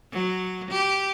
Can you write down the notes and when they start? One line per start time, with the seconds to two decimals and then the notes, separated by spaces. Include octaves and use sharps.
0.12 F#3
0.71 G4